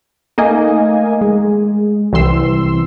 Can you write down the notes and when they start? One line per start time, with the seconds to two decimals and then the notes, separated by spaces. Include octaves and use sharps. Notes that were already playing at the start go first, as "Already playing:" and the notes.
0.38 A3 A#3 D#4 D#5 G#5
1.21 G#3
2.13 C2 E3 C4 C6 E6